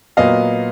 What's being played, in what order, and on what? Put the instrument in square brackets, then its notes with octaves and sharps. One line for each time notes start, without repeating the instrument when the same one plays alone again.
[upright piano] A#2 F#3 B3 D#5 F5